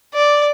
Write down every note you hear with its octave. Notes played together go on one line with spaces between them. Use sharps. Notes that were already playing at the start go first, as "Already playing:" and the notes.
D5